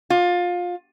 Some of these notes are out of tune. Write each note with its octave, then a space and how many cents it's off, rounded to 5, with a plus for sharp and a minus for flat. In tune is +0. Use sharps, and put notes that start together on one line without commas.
F4 +20